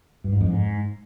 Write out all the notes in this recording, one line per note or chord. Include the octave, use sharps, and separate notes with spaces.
G2
G#2
F2
G#2